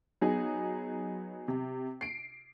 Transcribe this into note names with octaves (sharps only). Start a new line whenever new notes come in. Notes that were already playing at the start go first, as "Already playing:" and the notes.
F#3 B3 D#4 G#4
C3
C7 D7